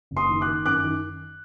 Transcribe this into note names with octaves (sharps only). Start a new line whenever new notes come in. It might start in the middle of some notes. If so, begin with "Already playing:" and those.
F#1
C6 D#6
D#3
D6 F#6
D#3
F#2 D6 F#6
D#3